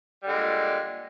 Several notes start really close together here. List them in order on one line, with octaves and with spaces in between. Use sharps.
G3 D3 G#3 A#2